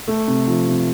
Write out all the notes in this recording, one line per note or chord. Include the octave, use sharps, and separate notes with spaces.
A3
C3
F3
C3